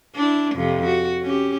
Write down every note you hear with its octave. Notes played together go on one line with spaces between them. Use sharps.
D4 E4
F2 C3
F#4
C#4 G4